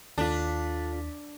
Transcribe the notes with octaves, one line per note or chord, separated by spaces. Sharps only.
D#2 D4 F4 A4 B6